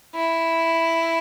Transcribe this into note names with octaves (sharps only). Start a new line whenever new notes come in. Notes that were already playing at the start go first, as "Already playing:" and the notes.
E4